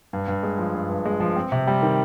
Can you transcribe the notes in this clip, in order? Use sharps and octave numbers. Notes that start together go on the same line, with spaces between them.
G2
G2
G#3
F3
G2
G2
G#3
F3
C4
C3
G3
D#3